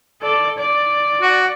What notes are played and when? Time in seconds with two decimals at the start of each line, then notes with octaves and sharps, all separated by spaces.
0.22 A4 D5
0.57 D5
1.21 F#4 F#5